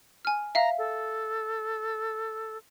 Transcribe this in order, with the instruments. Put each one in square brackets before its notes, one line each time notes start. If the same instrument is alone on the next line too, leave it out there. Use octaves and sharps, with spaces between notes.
[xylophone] G#5 F6
[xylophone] E5 F5 [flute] A#5
[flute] A4